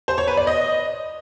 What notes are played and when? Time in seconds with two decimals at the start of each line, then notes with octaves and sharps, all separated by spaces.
0.08 C5
0.18 C#5
0.28 B4
0.37 D5
0.47 D#5